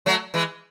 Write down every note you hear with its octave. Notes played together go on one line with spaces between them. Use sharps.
F#3 A3
E3 G#3